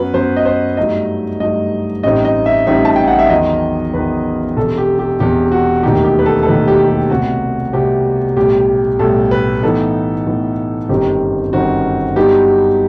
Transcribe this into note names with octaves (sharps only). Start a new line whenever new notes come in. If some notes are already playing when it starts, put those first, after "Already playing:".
Already playing: F#2 F#3 B3 B4
F#2 F#3 B3 C5
D#5
C5
G2 F#3 A3 D#4 D#5
G2 F#3 A3 D#4 D#5
A1 A2 G3 C4 D#4 D#5
D#5
E5
A1 A2 G3 C4 D#4 E5
A5
G5
F#5
E5
E2 D#3 F#3 D#5
E2 D#3 F#3 B4
E1 E2 C3 A4
G4
G4
E1 E2 C3 G4
F#4
E1 D#2 D#3 F#3 A3 G4
G4
B4
A4
A4
E1 D#2 D#3 F#3 A3 B4
G4
G4
C2 B2 A3 C4 F#4
C2 B2 A3 C4 G4
B1 A2 G3 G4
B1 A2 G3 A4
B4
A2 E3 B3 D#4 A4
A2 E3 B3 D#4
G1 F#2 D#3 G3 C4 G4
G1 F#2 D#3 G3 C4 F#4
G2 F#3 B3 D#4 G4